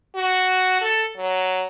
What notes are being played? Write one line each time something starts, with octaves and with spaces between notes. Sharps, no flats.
F#4
A4
F#3